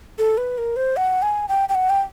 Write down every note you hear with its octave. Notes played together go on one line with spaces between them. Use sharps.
A4
B4
A#4
C5
F#5
G#5
G5
G5
F#5
G5